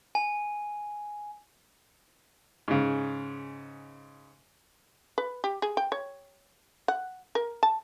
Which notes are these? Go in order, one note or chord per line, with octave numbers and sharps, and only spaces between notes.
G#5
G#2 C#3
B4
G4
G#4
G5
C#5
F#5
A#4
A5